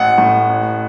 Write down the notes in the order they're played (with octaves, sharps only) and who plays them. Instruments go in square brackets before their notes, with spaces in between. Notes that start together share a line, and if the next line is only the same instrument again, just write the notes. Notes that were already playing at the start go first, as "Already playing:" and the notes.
Already playing: [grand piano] A1 F#5
A2
A1